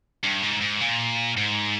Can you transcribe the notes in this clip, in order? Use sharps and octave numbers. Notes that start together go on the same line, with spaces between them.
G2
G#2
G#2
A#2
G#2